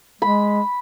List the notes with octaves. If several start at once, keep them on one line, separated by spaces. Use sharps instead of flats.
G#3 B5